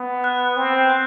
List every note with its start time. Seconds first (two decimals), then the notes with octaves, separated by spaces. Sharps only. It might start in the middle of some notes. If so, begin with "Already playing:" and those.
Already playing: B3
0.24 F#6
0.57 C4
0.90 G6